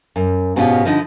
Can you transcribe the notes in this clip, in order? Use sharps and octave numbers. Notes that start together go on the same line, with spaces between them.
F#2
G#2 B2 C#4 D4 F4 G4
D3 F3 D#4 E4